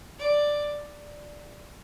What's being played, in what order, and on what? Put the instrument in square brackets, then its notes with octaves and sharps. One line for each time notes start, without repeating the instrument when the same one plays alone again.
[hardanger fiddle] D5